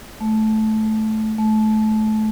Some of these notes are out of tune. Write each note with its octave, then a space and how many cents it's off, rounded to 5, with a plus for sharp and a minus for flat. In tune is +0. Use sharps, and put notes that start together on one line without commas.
A3 -15
A3 -25